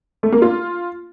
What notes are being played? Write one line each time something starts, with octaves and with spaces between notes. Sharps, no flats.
A3
A#3
F4